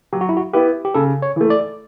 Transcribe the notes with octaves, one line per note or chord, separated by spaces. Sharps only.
F#3 G4
F#4
E4
F#4
B3 E4 G4 B4
G4
C#3 A4
C#5
E3 A3
D5